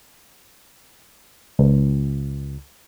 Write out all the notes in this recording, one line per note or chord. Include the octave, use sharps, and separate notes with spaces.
C#2